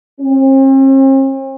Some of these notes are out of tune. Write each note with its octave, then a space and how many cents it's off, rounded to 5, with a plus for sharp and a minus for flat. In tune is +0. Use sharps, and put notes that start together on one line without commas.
C4 +45